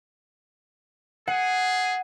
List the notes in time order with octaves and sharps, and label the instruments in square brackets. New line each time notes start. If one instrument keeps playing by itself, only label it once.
[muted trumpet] G#4 [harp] F#5